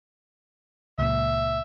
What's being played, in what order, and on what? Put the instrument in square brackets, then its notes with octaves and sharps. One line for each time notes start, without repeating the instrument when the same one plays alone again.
[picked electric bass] C#2 A#2 [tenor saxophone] E5